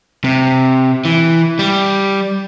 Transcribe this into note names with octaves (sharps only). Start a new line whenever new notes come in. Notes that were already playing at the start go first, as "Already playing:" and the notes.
C3
E3
G3